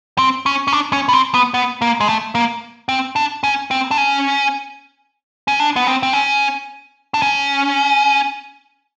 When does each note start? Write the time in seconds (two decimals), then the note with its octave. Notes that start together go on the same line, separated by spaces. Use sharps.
0.18 C4
0.46 C#4
0.68 C#4
0.73 D4
0.93 C#4
1.09 B3
1.13 C4
1.34 B3
1.54 B3
1.82 A#3
2.00 G#3
2.08 A3
2.35 A#3
2.89 C4
3.16 D4
3.43 C#4
3.71 C4
3.91 D4
3.97 C#4
5.48 C#4
5.60 D4
5.76 B3
5.87 C4
6.03 C4
6.13 C#4
7.14 D4
7.22 C#4